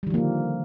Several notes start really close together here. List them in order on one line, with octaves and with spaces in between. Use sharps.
G3 D#3 F3 A#3 D3